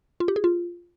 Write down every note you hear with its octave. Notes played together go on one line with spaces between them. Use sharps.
F4
G4
G#4
F4